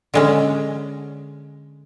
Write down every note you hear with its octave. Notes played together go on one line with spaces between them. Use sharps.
D3 G#3 C#4